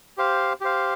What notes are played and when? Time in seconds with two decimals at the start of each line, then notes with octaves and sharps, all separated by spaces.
0.18 G4 C5 F5
0.61 G4 C5 F5